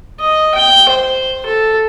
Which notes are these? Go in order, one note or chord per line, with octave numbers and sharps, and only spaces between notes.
D#5
G5
C5
A4